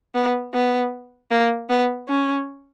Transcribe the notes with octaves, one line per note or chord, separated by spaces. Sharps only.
B3
B3
A#3
B3
C#4